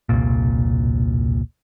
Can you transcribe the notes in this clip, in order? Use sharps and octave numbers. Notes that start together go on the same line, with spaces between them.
E1 C2 A#2